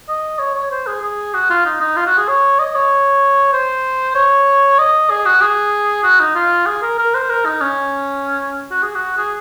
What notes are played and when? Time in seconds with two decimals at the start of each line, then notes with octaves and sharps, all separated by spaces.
0.09 D#5
0.39 C#5
0.55 C#5
0.71 C5
0.87 G#4
1.02 G#4
1.34 F#4
1.50 F4
1.66 D#4
1.80 D#4
1.96 F4
2.07 F#4
2.17 G#4
2.28 C#5
2.59 D#5
2.75 C#5
3.53 C5
4.15 C#5
4.79 D#5
5.10 G#4
5.26 F#4
5.41 G#4
6.03 F#4
6.20 D#4
6.35 F4
6.66 G#4
6.82 A#4
6.98 A#4
7.14 C5
7.30 A#4
7.45 D#4
7.61 C#4
8.71 F#4
8.82 G#4
8.95 F#4
9.17 G#4